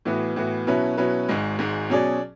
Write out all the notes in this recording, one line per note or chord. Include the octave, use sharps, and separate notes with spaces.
A2 E3 B3 F#4
A2 E3 B3 F#4
B2 F#3 C#4 E4 B4
B2 F#3 C#4 E4 B4
G#1 G#2 G#3
G#1 G#2 G#3
B2 F#3 C#4 G#4 D5